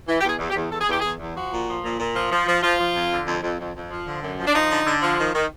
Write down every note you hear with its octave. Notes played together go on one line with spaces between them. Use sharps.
E3
G4
E2 G#4
E2
G4
E2
E2 A4
G#4
E2 G4
E2 G#4
E2
F3 F#4
A#2
F3
A#2
A#2
F3
F3
F3
F3 F4
F3
F2
D3
F2
F2
F2
F2
F3
D3
F#2
F3
D4
F3 D#4
D3
D3
F3
D#3
D#3